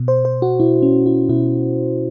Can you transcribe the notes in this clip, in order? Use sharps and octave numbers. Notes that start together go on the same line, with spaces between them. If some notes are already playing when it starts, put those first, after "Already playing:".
Already playing: B2
C5
C5
F#4
B2 E4
C#4
E4
B2 E4